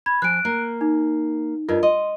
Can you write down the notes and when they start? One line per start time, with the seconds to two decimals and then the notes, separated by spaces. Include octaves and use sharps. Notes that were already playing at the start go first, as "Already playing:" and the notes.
0.06 B5 G#6
0.22 F3 G#5 F#6 D7
0.45 A#3
0.81 D#4
1.69 G2 F4 A#4 D#5
1.83 D#5 C6